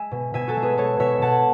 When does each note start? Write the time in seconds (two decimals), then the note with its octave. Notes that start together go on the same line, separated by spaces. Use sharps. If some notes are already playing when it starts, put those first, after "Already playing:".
Already playing: G#3 E5 G#5
0.11 B2
0.34 B2 E5 G#5
0.48 F#4 A4
0.56 G#3
0.63 G#4 B4
0.78 G#3 A4 C#5
0.99 B2 C#5 E5
1.22 B2 F#5 A5